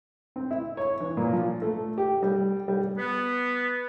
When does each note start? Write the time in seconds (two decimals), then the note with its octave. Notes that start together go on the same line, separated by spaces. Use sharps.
0.36 C4
0.51 E4
0.77 C#5
1.01 E3
1.17 A#2
1.32 F3
1.62 A3
1.98 G4
2.23 G3
2.68 G3
2.98 B3 B4